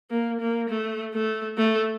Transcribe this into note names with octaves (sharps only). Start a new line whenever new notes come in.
A#3
A#3
A3
A3
A3